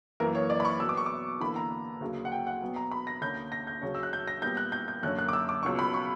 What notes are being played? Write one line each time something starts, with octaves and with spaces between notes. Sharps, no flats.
F#2 E3 A#3 A#4
C#5
D5
B5
C#6
B2 F#3 B3 E6
D6
C#6
D6
E2 D3 A#3 B5
A#5
D2 C#3 F#3 A#3
F#5
G5
F#5
B2 F#3 B3
A#5
B5
A#6
D2 D3 A#3 C#4 G6
A#6
G6
D2 C#3 F#3 C#4
E6
F#6
G6
A#6
A#2 G3 B3 G6
F#6
G6
G6
F#2 D3 A#3 C#4 F#6
F#6
D6
E6
D6
C#2 B2 F#3 C#4 C#6
B5
C#6